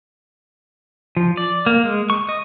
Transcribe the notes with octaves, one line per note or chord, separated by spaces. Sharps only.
F3
D5
A#3
G#3
C#6
D#5